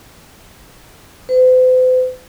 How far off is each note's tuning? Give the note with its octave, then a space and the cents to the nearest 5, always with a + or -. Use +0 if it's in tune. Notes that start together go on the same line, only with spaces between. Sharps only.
C5 -45